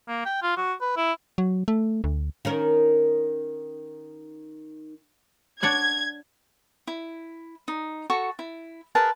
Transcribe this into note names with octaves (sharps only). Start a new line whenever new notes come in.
A#3
G5
F4
F#4
B4
E4
F#3
A3
D2
D#3 C#4 A#4
D4 C#5 F#5 G#6
E4
D#4
F#4 A4 C#6
E4
G#4 A#4 B4 A5